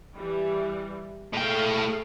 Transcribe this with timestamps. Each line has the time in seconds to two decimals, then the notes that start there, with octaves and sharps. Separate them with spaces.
0.16 E3 G3
1.33 A2 A3 G#4 F5 G5